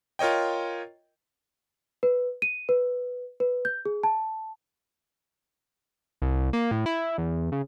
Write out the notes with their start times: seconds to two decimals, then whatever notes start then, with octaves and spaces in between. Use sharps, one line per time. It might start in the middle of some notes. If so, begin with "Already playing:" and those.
0.19 F4 A#4 C#5 D#5 G5
2.03 B4
2.42 D#7
2.69 B4
3.40 B4
3.65 G6
3.85 G#4
4.03 A5
6.22 C2
6.53 A#3
6.71 A2
6.86 E4
7.18 E2
7.52 C#3